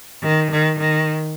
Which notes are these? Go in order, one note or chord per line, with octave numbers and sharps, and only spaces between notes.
D#3
D#3
D#3